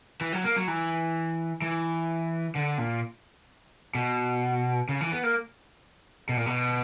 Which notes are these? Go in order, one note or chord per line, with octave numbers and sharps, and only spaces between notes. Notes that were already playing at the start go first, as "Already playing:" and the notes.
E3
F#3
A#3
F#3
E3
E3
D3
A#2
B2
C#3
E3
B3
A#3
B2
A#2
B2